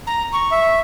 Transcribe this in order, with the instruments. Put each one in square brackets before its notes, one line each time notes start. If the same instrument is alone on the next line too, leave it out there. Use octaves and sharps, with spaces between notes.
[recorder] A#5
C#6
[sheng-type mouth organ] E5